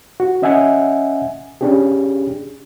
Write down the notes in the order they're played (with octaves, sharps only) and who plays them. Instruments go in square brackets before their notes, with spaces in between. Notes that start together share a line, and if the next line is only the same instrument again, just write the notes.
[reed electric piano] F#4
C#4 D#5 E5 F#5 G#5
C#4 D4 G4 G#4